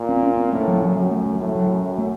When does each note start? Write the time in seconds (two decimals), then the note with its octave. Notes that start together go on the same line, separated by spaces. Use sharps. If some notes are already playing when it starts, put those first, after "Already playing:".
Already playing: A#2
0.09 C4
0.23 C#4
0.37 C4
0.52 A2 A#3
0.68 F#3
0.81 F#2 F3
0.96 F#3
1.11 A3
1.26 A3
1.40 A2 F#3
1.55 F#3
1.70 F#2
1.98 A3